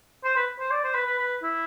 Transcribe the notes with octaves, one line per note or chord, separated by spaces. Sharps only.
C5
B4
C5
D5
C5
B4
B4
B4
E4